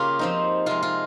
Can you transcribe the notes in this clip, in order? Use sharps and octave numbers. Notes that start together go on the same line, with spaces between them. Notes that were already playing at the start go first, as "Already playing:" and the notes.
Already playing: C#3 A#3 C#4 F4 G4 A#4
F3 C4 D#4
C3 F3 G#3 F4
F4